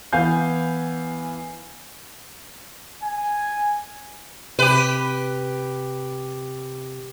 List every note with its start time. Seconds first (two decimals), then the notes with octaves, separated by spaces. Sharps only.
0.13 E3 B3 F5 G#5 G6
3.03 G#5
4.59 C3 G4 B4